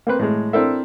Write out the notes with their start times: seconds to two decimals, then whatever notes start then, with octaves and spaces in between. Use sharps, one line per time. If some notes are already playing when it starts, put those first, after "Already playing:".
0.07 A#3 C4 B4
0.19 A2 G#3
0.53 C4 D4 E4 A4 A#4 E5